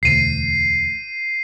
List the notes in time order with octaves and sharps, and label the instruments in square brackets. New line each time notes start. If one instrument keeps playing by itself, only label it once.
[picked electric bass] E1 D2 [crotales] C7 D#7